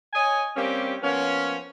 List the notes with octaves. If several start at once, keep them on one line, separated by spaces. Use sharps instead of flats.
C#5 D#5 G#5
G3 A#3 C4 C#4 G4
F3 A#3 B3 C#4